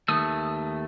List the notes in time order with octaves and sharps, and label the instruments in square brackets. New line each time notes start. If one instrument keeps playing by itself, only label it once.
[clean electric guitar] D#2 A3 [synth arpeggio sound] D#6